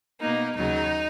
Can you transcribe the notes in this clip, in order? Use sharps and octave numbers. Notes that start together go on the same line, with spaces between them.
B2 A#3 D#4
D#2 C#3 F#3 D#4